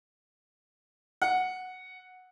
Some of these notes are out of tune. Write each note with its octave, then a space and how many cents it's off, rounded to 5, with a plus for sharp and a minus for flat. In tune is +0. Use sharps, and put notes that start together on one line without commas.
F#5 -5